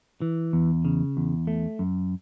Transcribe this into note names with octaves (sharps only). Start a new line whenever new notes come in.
E3
E2
C#3
E2
A3
F#2